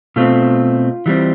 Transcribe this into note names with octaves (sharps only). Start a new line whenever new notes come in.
B2 A3 C4 F4
E3 G3 C4